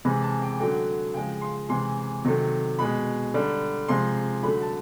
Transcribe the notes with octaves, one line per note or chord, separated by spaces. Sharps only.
C3 E3 G#3 B5
A5
G5
D3 F#3 A3 G5
C#3 F3 G#3 G5
C6
C3 E3 G#3 C6
C3 D#3 F#3 A3
B2 G#3 B5
D3 G3
C3 F3 G#3 C6
D3 F#3 A3 B5
A5